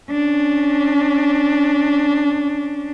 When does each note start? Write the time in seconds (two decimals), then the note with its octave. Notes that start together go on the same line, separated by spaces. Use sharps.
0.11 C#4 D4